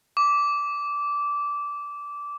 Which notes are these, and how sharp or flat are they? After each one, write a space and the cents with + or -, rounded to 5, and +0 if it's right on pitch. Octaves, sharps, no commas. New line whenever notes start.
D6 -15